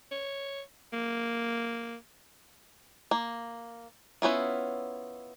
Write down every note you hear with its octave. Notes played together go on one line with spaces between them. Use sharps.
C#5
A#3
A#3
B3 C#4 E4 F4